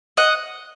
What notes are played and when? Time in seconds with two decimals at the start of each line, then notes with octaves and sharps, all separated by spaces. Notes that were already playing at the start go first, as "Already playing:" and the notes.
0.17 D#5 F#5